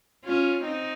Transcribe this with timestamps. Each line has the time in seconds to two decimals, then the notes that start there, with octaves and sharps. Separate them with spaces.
0.24 C#4 F4
0.65 C4 D#4